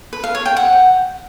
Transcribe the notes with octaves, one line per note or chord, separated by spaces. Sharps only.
B4
F5
C#5
G5
F#5